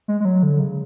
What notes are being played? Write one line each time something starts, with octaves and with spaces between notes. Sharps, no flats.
G#3
G#3
F#3
D3
C#3